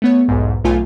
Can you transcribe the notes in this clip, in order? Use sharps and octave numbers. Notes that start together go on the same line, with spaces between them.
A3 B3 C#5
B1 E2 G#2
B1 F#3 A3 F4 G5 G#5